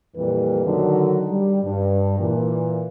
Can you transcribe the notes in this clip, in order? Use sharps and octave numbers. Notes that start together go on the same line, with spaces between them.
F2 A#2 E3 G3 B4
D3 D#3 F#3
G3
G2
A#2 E3